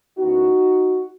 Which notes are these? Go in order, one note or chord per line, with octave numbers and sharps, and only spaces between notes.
F#2 E3 B3 D#4 F#4